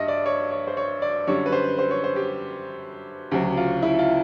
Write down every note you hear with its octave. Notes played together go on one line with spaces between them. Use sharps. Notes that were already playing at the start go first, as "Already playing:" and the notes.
Already playing: G2 G3 D#5 E5
D5
C#5
C#5
C5
C#5
D5
F#2 D3 G3 C#5
B4
C5
C5
C#5
C5
G4
D2 C#3 F#3 G4
F4
E4
F4